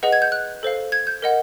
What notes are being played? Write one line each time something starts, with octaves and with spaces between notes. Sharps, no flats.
G#4 B4 D#5 F#5
G#6
G6
F#6
A4 C5 F5
G#6
G6
A#4 D#5 F#5